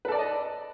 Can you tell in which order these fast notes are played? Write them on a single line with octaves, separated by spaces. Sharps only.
B4 A4 D5 A5 D#5